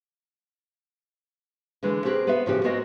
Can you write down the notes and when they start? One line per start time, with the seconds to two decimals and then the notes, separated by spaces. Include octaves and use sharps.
1.83 D3 E3 G#3 A3
2.05 B2 C4 G4 G#4 A#4 B4
2.27 B3 B4 C5 D5 E5
2.46 A2 C#3 F3 B3 F#4 G4
2.64 G#3 B3 C4 F#4 A#4 D#5